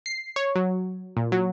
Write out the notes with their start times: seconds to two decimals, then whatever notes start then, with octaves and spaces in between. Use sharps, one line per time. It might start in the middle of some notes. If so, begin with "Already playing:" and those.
0.06 C7
0.36 C#5
0.55 F#3
1.17 A#2
1.32 F#3